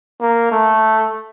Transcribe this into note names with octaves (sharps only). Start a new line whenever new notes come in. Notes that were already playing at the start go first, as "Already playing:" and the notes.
A#3
A3